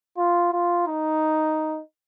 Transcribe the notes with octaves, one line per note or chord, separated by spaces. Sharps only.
F4
F4
D#4